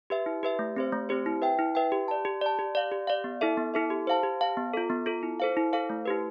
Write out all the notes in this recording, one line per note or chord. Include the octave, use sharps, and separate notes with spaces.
G4 B4 E5
E4
G4 B4 E5
A3
C4 G4 C5
A3
C4 G4 C5
E4
B4 E5 G5
E4
B4 E5 G5
G4
D5 A5
G4
D5 A5
G4
D5 F5
G4
D5 F5
B3
E4 A4 E5
B3
E4 A4 E5
G4
C5 F5 A5
G4
C5 F5 A5
B3
F4 A4
B3
F4 A4
E4
A4 C5 F5
E4
A4 C5 F5
A3
E4 G4 B4